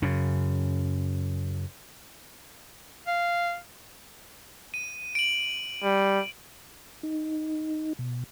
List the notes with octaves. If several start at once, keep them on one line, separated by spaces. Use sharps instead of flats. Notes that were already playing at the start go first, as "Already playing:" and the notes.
F#2 C#3
F5
D#7
D7 F#7
G3
D#4
B2